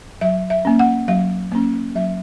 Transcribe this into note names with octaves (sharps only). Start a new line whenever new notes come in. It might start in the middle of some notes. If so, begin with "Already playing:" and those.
F#3 E5
E5
A#3 C#4
F#5
F#3 F5
A#3 C#4
F#3 E5